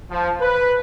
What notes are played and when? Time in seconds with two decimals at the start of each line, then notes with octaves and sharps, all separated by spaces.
0.10 F3
0.41 B4